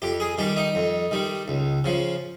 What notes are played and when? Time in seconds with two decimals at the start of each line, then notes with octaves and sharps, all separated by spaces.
0.02 F2 G4
0.20 G#4
0.38 D#3 G3 G4
0.57 D#4
0.75 F2
1.11 D#3 G3
1.48 C#2
1.84 C#3 F3